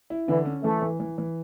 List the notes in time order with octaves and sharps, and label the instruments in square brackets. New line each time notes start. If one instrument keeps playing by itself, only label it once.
[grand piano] E4
[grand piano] D3 [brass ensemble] E3
[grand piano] C#4
[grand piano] E3 [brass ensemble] A3
[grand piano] E3
E3
E3